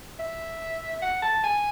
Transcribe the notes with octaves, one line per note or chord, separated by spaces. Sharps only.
E5
F#5
A5
G#5